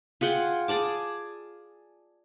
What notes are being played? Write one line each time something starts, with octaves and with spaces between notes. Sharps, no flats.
F4 G#4 F#5 G5
G#4 D5 A5 D6